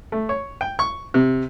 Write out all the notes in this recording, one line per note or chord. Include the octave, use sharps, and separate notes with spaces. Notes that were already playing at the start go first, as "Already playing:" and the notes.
A3
C#5
G5
C#6
C3